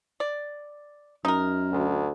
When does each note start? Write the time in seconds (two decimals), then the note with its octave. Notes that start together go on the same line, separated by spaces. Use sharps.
0.20 D5
1.25 F#2 D#4 A#4
1.71 D2